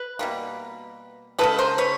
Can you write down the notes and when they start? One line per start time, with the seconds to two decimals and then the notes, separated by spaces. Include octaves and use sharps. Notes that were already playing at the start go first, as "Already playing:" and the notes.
Already playing: B4
0.19 B2 G3 A#3
1.39 C#3 F3 G#3 A4 B4
1.58 A#4 C5
1.78 B4 C#5